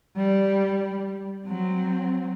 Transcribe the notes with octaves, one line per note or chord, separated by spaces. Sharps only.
G3
F#3 C4